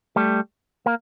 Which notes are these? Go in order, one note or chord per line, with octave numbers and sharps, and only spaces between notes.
G3 A3
A#3